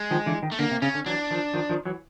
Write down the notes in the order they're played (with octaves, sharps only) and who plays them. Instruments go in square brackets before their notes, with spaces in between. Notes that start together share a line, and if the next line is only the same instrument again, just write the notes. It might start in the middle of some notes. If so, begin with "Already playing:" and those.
Already playing: [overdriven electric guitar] G#3
[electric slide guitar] D#3 F3
D3 E3
D#3
[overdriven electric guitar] A3
[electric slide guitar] D3 [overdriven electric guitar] A#3
[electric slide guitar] C3
[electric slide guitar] C#3 [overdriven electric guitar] C#4
[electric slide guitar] D3
[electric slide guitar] E3 F#3 [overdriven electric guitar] D4
[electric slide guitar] D#3 F3
D#3 F3
D#3 F3
E3 F#3